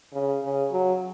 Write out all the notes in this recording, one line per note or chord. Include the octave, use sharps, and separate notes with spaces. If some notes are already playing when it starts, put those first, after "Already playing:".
C#3
C#3
F#3